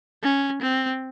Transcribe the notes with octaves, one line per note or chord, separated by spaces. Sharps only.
C#4
C4